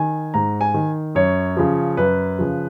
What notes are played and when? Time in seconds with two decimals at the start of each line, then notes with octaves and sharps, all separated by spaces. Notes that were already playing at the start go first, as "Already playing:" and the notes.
Already playing: D#3 G#5
0.34 G#2 A#5
0.61 G#5
0.74 D#3
1.15 F#2 C#5
1.57 C#3 F3
1.97 F#2 B4
2.39 C#3 F3